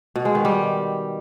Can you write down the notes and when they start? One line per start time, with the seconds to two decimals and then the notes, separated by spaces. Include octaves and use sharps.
0.16 B2
0.25 G#3
0.35 D#3
0.45 G3